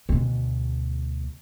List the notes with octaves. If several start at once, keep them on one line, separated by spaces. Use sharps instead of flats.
D2 B2